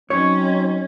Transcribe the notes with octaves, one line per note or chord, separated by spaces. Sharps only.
F#3 C4 C#4 D#4 C#5